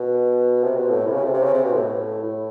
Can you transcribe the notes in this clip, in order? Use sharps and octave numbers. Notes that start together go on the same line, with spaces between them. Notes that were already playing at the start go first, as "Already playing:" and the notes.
Already playing: B2
C3
B2
A2
C3
C#3
C3
C3
C#3
C3
B2
A2
A2